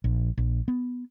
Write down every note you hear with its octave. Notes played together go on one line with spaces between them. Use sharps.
A#1
A#1
B3